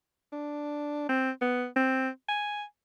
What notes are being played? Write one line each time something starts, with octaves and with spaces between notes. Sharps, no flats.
D4
C4
B3
C4
G#5